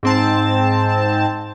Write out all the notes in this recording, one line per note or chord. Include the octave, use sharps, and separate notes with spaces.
G#2 C4 A5